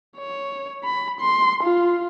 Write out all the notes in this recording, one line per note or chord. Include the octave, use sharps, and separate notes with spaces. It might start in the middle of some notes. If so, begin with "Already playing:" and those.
C#5
B5
C6
F4